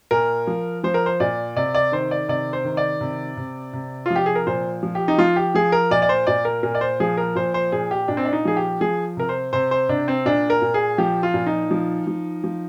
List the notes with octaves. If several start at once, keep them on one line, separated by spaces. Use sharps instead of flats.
A#2 A#4
F3
F3 C5
A#4
C5
A#2 D5
C3 D5
D5
D#3 C5
D5
C3 D5
C5
D#3
D5
C3
C3
C3
F3 F4
G4
G#4
A#4
A#2 C5
F3
G4
D#4
F3 F4
G4
F3 G#4
A#4
A#2 D5
D5
C5
A#2 D5
A#4
A#2 A#4
D5
C5
F3 G#4
A#4
A#2 C5
C5
A#2 G#4
G4
A#2 D4
C4
D4
D#4
F3 G#4
G4
F3 G#4
C3 A#4
C5
C3 C5
C5
C3 D4
C4
A#2 D4
A#4
A#2
G#4
F3 G4
F4
A#2
D#4
F3
F3
F3